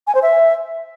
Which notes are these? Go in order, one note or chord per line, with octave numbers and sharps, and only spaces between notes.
G#5
C5
E5